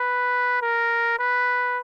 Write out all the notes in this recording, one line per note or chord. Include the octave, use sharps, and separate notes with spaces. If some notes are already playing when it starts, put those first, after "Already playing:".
Already playing: B4
A#4
B4